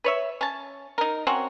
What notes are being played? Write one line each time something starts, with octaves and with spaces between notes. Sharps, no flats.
B4 C#5 E5
C#4 A5
D#4 A#4
C4 C#4 F#4 A#4